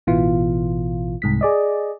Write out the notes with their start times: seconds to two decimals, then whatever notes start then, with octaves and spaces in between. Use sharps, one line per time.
0.07 A1 B2 E3 F4
1.22 C2 G#2 B6
1.41 G#4 D5 D#5